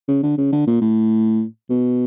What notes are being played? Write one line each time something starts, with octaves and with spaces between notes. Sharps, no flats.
C#3
D3
C#3
D3
A#2
A2
B2